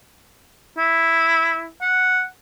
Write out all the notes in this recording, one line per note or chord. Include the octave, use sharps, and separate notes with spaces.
E4
F#5